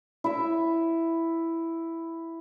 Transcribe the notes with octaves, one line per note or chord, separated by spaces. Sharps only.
E4 E5